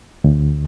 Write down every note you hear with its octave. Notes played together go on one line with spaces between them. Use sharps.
D2